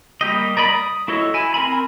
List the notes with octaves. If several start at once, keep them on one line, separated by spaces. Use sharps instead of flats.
G3 A#3 G4 D#5
A#4 D5 D#5 B5
D#6
E4 F#4 A4 C#5 D#5
E4 G#5
C4 A#4 G#5 B5